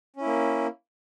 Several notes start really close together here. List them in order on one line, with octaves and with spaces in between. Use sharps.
C#4 E4 A#3